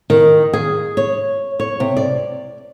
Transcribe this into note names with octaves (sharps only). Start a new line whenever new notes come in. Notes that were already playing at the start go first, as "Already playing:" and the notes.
D#3
G#4
C#5
C#5
C3
D5